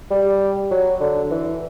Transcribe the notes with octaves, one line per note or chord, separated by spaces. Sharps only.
G3
F#3
D3
E3